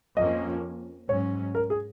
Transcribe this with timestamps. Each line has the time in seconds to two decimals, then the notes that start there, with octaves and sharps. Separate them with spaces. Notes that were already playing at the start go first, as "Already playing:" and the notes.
0.17 F2 F3 A#3 C#4 D#5
1.09 G#2 F#3 C#4 C#5
1.55 A#4
1.70 G#4